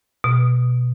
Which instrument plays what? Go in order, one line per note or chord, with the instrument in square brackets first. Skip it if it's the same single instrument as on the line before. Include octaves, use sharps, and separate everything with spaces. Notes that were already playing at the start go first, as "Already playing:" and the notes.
[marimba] B2